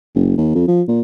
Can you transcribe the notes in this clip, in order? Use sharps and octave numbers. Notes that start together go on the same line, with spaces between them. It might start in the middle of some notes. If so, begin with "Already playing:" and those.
F#1
D#2
F2
F3
A#2